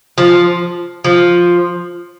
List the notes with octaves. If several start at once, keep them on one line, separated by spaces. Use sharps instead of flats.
F3
F3